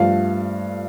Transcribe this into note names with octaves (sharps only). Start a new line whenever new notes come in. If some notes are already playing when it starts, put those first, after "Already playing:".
Already playing: G2 F3 A3 F5